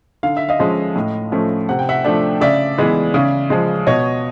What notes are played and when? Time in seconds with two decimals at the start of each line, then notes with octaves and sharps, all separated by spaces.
0.23 D3 F5
0.37 E5
0.49 D#5 F5
0.59 F3 G#3 C#4
0.96 A2
1.32 F3 A3 C#4
1.69 C3 F#5
1.79 G5
1.89 E5 F#5
2.04 F3 A3 D4
2.41 C#3 D5 E5
2.78 E3 G#3 B3
3.14 C#3
3.50 F3 G#3
3.87 B2 C#5 D#5